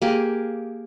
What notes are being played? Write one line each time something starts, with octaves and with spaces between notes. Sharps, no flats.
A#3 G4 G#4